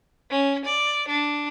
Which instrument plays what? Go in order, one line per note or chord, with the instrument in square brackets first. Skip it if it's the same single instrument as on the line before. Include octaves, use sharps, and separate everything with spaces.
[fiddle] C#4
D5
D4